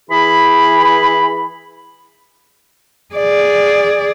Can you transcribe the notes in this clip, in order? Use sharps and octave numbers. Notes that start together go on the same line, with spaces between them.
E3 G#4 B5
G#4 D5